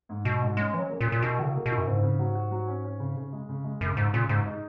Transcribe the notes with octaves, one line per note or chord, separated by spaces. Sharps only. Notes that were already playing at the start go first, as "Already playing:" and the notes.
G#2
G#2 B2
G#2
G#3 C#4
E3 C#4
F#3
A#3
A#2
A#3
A#2
B2 E4
D#3 F#3
C#3
A#3
B2 E4
F#2
G#2 C#3
C#3
F#3
F#4
F#3
C#4
C#4
C#3
C#3
G#3
C#3
G#3
F#2 C#3
G#2 G#3
A#2 C#3
G#2 G#3
D#4